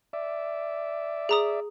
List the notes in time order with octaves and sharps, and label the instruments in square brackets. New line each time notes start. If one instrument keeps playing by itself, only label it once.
[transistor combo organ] D5 E5
[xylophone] G#4 A#5 D#6